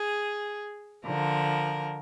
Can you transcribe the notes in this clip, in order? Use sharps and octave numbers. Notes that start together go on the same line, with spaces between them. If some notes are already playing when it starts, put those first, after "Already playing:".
Already playing: G#4
D3 F3 A#4